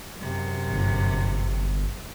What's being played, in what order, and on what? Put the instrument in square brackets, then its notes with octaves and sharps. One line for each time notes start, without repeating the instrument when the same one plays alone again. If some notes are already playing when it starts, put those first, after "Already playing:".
[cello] F#2 C3
[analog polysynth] G1